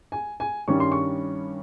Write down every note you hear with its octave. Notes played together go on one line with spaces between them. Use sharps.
G#5
G#5
G2 D#3 G3 C#4 C#6
C6
C#6